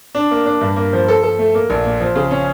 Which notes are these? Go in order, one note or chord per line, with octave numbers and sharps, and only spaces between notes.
D4
A#3
D4
G2
A#3
F3
A4
A4
A3
A#3
A#1
A#2
F3
C#3
C#4